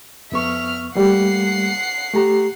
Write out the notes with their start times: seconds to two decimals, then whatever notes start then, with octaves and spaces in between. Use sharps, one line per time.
0.32 F2 B3 E5 C#6 F6
0.96 G3 A3 A#3 F#5 C7
2.13 A3 G4 A#5